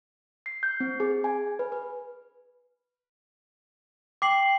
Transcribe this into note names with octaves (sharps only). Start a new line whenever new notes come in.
C7
G6
C4
G#4
G#5
B4
B4
G5 D6 C7 F#7